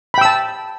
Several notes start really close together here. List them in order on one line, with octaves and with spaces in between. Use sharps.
B5 G5 E6 A5